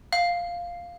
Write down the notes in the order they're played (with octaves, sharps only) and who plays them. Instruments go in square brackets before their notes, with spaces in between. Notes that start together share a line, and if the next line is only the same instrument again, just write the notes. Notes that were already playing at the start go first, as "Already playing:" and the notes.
[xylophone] F5